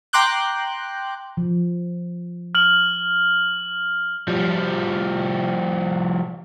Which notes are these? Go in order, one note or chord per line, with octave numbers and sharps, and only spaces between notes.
G5 A#5 C6 D6 F#6 G6
F3
F6 F#7
F3 G3